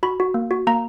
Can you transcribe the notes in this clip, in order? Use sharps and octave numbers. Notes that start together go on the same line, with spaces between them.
F#4 B5
F#4
A#3
F#4
A#3 A#5